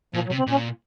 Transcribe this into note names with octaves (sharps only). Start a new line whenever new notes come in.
A#2 F3
F#3
C3
C4
A#2 C#4